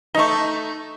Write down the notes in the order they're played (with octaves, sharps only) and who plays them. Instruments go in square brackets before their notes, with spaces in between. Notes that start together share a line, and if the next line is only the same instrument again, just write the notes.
[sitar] A3 D#4 [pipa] D#5 C#6